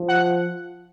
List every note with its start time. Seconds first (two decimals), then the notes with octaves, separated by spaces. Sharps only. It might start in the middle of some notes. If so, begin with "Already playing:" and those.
Already playing: F3
0.09 F#5